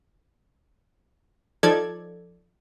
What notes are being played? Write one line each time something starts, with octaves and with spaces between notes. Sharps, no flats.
F3 D#4 A4 D5 G#6